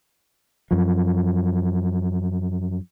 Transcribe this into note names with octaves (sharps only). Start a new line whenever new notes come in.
F#2 F3